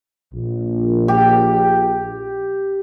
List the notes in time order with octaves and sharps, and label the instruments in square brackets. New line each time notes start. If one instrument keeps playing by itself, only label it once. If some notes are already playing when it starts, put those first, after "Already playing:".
[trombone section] A#1
[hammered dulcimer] G4